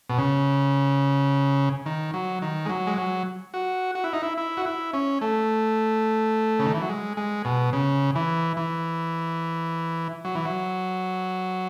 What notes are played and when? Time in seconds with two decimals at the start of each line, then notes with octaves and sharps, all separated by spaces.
0.09 B2
0.18 C#3
1.86 D#3
2.14 F#3
2.42 D#3
2.66 G#3
2.69 F#3
2.87 G#3
2.98 F#3
3.54 F#4
3.95 F#4
4.04 E4
4.13 D#4
4.22 E4
4.38 E4
4.57 F#4
4.66 E4
4.93 C#4
5.21 A3
6.59 C#3
6.66 D#3
6.74 E3
6.82 F#3
6.89 G#3
7.17 G#3
7.45 B2
7.73 C#3
8.15 E3
8.57 E3
10.25 F#3
10.35 E3
10.45 F#3